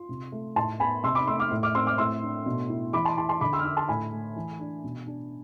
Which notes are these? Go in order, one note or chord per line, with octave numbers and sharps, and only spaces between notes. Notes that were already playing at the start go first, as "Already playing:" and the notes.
Already playing: F4 C6
C3
A3
A2 A5 C6
B3 G#5 B5
C3 C6 E6
B5 D6
A3 C6 E6
D6 F6
A2
D6 F6
C4 C6 E6
D6 F6
A2 C6 E6
D4
B2
E4
E3 B5 D6
A5 C6
E4 A5 C6
A5 C6
D3 B5 D6
C6 E6
F6
D4 C6 E6
A5 C6
A2 G#5 B5
A3
E3
D4
B2
D4